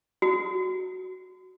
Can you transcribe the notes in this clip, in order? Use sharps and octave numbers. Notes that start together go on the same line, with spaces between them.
F#4